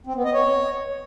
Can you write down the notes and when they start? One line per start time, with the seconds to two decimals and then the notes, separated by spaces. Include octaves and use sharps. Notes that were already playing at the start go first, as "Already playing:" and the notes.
0.07 C4
0.16 B3
0.25 D#5
0.34 C#5